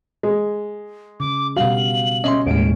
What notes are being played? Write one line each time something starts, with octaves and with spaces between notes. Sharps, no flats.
G#3
C#3 D6
B2 G3 F#4 F5 F#7
C#4 D#5 E5 C6
D#2 A2 G#3 D7